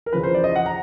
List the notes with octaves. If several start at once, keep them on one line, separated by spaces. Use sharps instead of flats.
A#4
E2 C#3 F3 B4
C5
D5
D#5
F#5
A#5